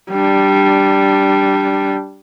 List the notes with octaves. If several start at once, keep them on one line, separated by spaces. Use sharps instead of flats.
G3 D4